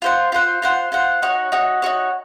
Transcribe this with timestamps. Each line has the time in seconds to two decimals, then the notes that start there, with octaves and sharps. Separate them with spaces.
0.02 F4 C5 F#5
0.32 F4 C5 F#5
0.62 F4 C5 F#5
0.92 F4 C5 F#5
1.22 D#4 F#4 C#5
1.52 D#4 F#4 C#5
1.82 D#4 F#4 C#5